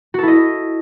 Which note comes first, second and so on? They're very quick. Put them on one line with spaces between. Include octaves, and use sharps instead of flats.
F#4 A4 E4 D#5